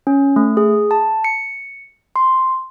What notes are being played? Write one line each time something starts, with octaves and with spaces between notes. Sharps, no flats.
C#4
A3
G#4
A5
C#7
C6